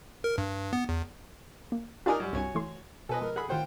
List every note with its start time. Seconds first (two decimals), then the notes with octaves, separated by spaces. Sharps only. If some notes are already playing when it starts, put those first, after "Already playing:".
0.24 A#4
0.38 G2
0.73 B3
0.89 E2
1.72 A#3
2.06 D4 D#4 F4 G4 A#4 G#5
2.20 F#2 G3
2.33 C2 G2 F#4 C#5 G#5
2.55 E3 A3 C6
3.09 B2 F3 A4 B4 D#5 G#5
3.22 G#3 A#4
3.36 G#4 A4 F#5 B5
3.49 A2 D#3 F4 C5 F#5 G5